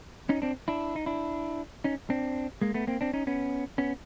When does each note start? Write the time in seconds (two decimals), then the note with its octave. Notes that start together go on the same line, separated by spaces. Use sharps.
0.29 C#4 D#4
0.42 C4 D4
0.68 D4 E4
0.96 D#4
1.06 D4 E4
1.84 C#4 D#4
2.10 C4 D4
2.62 G#3 A#3
2.74 A3 B3
2.87 A#3 C4
3.01 C4 D4
3.13 C#4 D#4
3.27 B3 C#4
3.78 B3 C#4